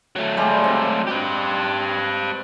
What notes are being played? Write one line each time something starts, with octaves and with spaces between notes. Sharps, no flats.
F#3 A3
G3 G#3 G4
C4
G4 B4